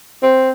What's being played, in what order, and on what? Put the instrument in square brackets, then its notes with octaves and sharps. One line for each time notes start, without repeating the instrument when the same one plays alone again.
[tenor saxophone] C4